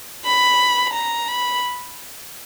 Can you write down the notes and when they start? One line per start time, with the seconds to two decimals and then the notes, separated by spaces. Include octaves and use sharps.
0.25 B5
0.94 A#5
1.28 B5